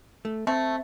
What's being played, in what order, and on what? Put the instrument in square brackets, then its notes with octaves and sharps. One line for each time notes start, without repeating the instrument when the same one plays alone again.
[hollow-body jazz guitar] A3
[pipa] A3 [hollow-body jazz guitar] C4